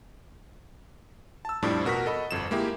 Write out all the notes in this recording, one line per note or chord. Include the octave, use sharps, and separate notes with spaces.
A5 E6
F2 A2 F3 G3 D4
B2 F#4 A#4 C#6 B6
A4 D#5 B5
G1 F2 E7
G#3 A#3 E4 G4